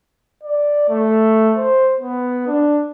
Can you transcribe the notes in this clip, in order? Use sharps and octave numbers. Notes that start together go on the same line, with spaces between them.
D5
A3
C5
B3
D4